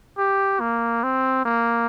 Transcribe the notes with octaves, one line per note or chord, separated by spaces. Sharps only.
G4
A#3
C4
A#3